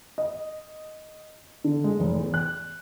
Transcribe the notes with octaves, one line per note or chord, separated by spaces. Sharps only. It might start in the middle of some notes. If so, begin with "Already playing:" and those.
D#5
D3
G#3
F1
E2
F#6